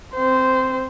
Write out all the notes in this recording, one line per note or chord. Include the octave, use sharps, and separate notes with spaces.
C4 C5